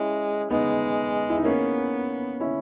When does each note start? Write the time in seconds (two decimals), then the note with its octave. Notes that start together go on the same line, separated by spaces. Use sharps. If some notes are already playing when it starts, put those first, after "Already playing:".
Already playing: G#3 C#4 E4
0.50 G#3 B3 D#4
1.30 E4
1.37 D#4
1.45 A#3 B3 C#4
2.40 C#4 E4